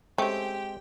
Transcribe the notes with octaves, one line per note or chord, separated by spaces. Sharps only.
G#3 A3 C4 C#4 G4 G5